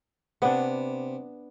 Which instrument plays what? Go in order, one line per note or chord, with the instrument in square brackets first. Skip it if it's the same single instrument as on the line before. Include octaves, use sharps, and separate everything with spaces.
[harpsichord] C3 [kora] B3 D4